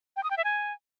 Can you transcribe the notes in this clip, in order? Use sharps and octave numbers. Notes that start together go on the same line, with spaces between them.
G5
D#6
G5
E5
G#5